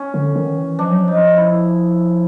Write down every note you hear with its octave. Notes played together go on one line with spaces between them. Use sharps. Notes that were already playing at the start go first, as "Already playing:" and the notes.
Already playing: C#4
D3
D#3
E3
F3 D4
F#3
F3 D#4
E4